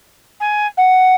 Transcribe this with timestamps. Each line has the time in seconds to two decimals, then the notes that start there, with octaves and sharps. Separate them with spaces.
0.40 G#5
0.77 F#5